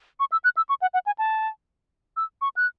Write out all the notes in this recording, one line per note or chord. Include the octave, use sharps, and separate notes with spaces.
C#6
E6
F#6
E6
C#6
F#5
F#5
G#5
A5
E6
C#6
F#6